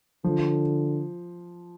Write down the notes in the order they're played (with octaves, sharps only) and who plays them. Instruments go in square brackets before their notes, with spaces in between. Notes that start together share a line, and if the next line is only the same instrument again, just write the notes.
[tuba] D3 [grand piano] F3